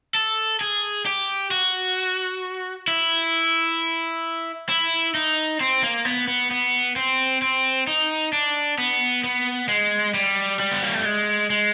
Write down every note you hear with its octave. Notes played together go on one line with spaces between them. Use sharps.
A4
G#4
G4
F#4
E4
E4
D#4
C4
A#3
B3
B3
B3
C4
C4
D#4
D4
B3
B3
G#3
G3
G3
B3
A#3
A3
G#3
G#3